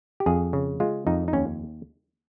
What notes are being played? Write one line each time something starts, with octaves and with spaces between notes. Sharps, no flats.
G4
F2 G#4
C#3
G#3 F4
F2 D#4
D#4
D#2 C#4